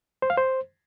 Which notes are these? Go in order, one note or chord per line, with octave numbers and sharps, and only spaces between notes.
C5
F5
C5